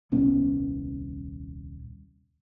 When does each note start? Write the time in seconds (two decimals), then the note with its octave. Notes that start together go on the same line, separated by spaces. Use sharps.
0.12 D#1 C2 B3 C#4